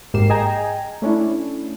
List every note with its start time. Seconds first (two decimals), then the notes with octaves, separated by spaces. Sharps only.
0.14 G#1 G#2 A#3 G4 C7 E7
0.30 G#4 D#5 G5 G#5 A#5
1.02 A3 C#4 D4 E4